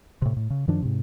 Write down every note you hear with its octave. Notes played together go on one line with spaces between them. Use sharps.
A2 C3
A2
C#3
F#2 D#3 F3 D4
G#2 C3